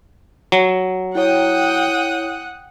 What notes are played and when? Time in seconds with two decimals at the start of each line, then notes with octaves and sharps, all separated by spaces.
0.52 F#3
1.15 E4 C#5 F#5 G5 D#6